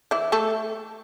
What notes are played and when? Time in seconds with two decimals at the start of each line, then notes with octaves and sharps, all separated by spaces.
0.11 E3 E4
0.32 A3 A4